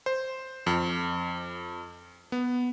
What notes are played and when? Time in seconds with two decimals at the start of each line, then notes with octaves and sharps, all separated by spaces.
0.06 C5
0.67 F2
2.32 B3